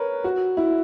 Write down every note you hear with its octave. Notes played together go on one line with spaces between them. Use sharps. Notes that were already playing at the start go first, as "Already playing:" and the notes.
Already playing: A#4 B4 C#5
F#4
E4